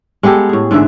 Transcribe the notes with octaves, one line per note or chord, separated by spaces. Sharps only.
G#3 B3 G4 A4
A2 G#4
G#2 D3 E3 E5